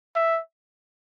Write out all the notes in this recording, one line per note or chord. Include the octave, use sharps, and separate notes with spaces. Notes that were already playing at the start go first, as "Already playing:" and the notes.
E5